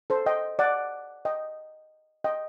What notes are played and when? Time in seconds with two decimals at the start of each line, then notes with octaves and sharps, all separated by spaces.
0.10 A4 C5
0.26 D#5 G5
0.59 D5 F#5
1.25 D#5 G5
2.24 D#5 G5